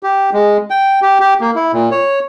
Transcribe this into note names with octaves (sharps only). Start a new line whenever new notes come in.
G4
G#3
G5
G4
G4
A#3
E4
A#2
C#5